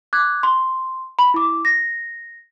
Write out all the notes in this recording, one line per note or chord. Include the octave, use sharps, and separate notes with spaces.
D6 F#6 G#6
C6
B5
E4 D6
A#6